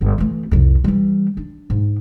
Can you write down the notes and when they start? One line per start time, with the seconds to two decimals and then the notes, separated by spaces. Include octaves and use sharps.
0.01 G1 D3
0.18 E3 A3
0.51 C2 F2
0.84 E3 G3
1.37 D4
1.70 G#2